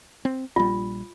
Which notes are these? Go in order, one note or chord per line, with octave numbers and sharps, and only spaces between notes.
C4
A#1 G3 F4